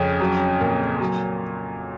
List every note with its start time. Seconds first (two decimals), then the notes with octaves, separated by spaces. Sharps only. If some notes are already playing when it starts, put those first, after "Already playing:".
Already playing: F2 C#3
0.21 F#3
0.60 A#2
1.01 F#3